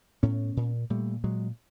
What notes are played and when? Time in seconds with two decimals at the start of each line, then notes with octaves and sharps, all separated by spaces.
0.23 A2 B3 C#4
0.57 A#2
0.90 A#2 G3 A3
1.24 A#2 F#3 G#3